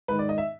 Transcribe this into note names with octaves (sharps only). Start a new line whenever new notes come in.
G#2 D#3 B4
D5
D#5
E5